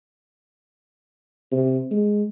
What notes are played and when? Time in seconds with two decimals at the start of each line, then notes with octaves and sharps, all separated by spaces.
1.51 C3
1.91 G#3